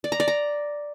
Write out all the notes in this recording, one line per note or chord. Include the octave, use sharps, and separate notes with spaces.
D5
A#5
D5
A#5